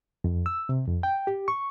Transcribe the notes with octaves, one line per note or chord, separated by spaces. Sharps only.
F2
E6
C3
F2
G5
G4
C#6